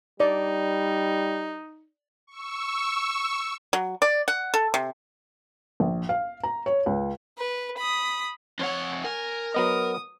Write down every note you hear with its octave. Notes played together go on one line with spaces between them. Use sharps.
G3 D#4 D5
C#6 E6
F#3
D5
F#5
A4
C3
A#1
F5
A#5
C#5
C#2
B4
B5 D#6
F2 C#5 F#5
A#4 G#5
F#3 B3 D#5 D#6